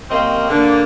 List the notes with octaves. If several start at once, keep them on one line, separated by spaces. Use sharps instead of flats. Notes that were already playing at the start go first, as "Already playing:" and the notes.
A#3 C4 C#4 G4 A#4 D#5
D3 A#3